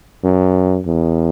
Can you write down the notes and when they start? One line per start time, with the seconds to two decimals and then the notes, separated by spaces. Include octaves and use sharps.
0.24 F#2
0.87 E2